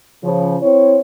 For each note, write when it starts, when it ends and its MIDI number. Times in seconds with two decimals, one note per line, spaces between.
0.24 0.57 49
0.24 0.57 53
0.62 1.00 60
0.62 1.00 64
0.62 1.00 73